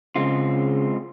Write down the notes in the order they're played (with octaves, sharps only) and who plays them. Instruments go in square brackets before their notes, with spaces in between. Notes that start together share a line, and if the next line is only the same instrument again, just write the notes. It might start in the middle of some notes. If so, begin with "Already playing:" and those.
[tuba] C#3 [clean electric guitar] G#3 C4 F4